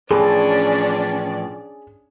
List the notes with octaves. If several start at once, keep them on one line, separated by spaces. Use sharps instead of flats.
A2 E3 F3 C#4 D4 G#4 D5